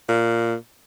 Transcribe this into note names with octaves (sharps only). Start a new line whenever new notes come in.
A#2